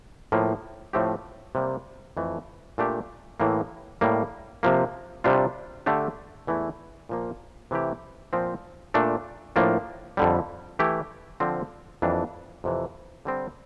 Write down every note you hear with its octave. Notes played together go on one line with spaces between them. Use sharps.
A2 F3 A#3
A2 F3 A3 C4 G4
C3 G3 A#3
F2 E3 A3
A#2 A3 D4 G4
A2 E3 A#3
A2 G3 A#3
C3 F3 A#3
C3 G3 D4 F4
D3 A3 D4 G4
E2 E3 A3 E4
A#2 F3 A#3
C3 E3 A3 E4 G4
A#2 F3 C4
A#2 A3 D4
A2 F3 A#3 D4
F2 D3 G3
E3 A3 E4 G4
D3 F3 C4
F2 E3 G3 A#3 D4
F2 C3 E3
D3 G3 C4